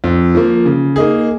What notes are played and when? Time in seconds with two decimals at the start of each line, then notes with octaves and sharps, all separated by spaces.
0.04 F2
0.35 F3 A#3
0.65 C#3
0.96 A#3 D#4 G#4